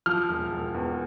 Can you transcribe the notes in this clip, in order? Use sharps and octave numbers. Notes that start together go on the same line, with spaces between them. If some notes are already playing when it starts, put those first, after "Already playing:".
F3 F6
E1
E1
E2